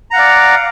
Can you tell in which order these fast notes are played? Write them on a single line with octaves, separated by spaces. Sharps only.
A#5 F#5 F5 D5